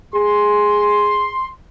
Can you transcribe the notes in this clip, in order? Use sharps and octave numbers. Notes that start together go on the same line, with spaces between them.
G#4 C6